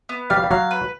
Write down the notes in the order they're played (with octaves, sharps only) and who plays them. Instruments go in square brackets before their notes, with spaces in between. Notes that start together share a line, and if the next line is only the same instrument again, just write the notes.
[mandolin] B3
[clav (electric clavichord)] G3 [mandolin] F5
[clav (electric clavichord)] G3
[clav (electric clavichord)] F#3 [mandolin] F5
[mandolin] B4